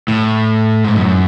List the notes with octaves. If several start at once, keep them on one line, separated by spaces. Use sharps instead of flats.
A2
G#2
F#2